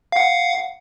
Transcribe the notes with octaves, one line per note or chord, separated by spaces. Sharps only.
F5 F#5